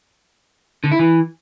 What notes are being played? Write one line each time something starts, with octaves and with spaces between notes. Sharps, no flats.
D3
E4
E3